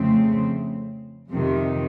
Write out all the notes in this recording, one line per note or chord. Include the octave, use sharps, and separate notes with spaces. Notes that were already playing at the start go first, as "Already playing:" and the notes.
Already playing: F2 C#3 A3 C4
F2 C3 D#3